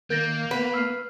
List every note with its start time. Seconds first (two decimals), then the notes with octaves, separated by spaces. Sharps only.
0.10 D#3 A#3 G6 A6 A#6
0.51 B3 B4
0.74 E6 F6 C7